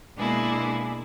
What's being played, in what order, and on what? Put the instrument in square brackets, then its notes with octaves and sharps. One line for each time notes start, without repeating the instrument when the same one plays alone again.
[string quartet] B2 G#3 A#3 D4 E4 G#4